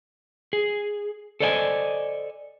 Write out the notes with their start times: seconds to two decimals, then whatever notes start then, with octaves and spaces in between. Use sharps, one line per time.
0.53 G#4
1.40 A4 C5 D5 D#5 F#5 G#5